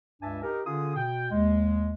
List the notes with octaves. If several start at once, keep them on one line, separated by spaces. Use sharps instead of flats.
C#2 G2 D4 E5 G#5 A5
D#4 G4 A#4
D3 C#4 F4 G#4 D#6
B2 G5
D#2 G#3